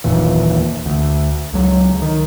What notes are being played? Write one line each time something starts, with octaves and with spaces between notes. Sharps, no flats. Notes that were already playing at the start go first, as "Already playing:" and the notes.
F#1 D#2 A#2 E3
D2
C#2 F#3
D#3